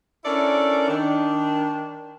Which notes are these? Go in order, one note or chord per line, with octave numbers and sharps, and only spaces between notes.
C#4 D4 E4 A4 A#4 D5
D#3 D4